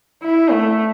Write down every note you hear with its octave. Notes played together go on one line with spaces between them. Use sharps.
E4
A3